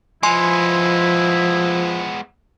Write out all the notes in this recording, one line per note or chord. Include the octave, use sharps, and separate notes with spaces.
F3 G#3 B3 E4 G#5 C6